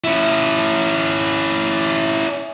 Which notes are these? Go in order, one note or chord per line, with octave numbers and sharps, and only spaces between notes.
C#4 E4